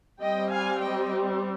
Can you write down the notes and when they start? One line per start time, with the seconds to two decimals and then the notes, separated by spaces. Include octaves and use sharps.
0.21 G3 C4 D#5 G5
0.50 F5 G#5
0.81 D#5 G5